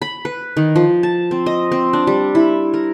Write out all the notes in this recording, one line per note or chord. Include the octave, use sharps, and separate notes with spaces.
B5
B4
D#3
F3
A5
C4
D#5
C4
D4
G3
E4
A#4